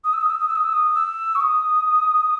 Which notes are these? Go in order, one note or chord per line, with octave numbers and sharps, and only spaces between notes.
D#6
E6
D#6
E6
D#6
E6
D#6
E6
D#6
E6
C#6
D#6